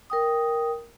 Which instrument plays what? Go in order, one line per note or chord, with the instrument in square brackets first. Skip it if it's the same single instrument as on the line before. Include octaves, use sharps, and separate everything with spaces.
[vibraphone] A#4 G5 D#6